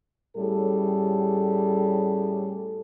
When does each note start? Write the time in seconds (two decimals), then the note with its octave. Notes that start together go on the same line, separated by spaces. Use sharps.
0.37 A2 G3 C#4 G#4 A4